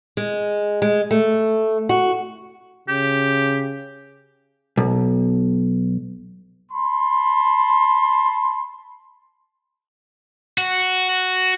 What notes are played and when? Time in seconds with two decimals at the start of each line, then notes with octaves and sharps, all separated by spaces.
0.17 G#3
0.82 G#3
1.11 A3
1.89 F#4
2.88 C#3 G4
4.77 B1
6.72 A5 B5 C6
10.58 F#4